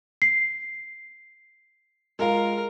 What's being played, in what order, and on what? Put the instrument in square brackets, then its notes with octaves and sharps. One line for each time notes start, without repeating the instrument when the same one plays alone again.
[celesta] C7
[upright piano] G#3 F4 F5 [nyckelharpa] A#4